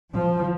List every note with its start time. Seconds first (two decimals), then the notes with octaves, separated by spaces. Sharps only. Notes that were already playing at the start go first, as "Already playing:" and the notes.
0.13 F3